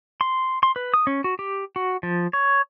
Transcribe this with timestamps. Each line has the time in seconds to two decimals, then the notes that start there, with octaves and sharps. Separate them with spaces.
0.21 C6
0.63 C6
0.76 B4
0.94 D#6
1.07 C#4
1.24 F#4
1.39 G4
1.76 F#4
2.03 F3
2.33 C#5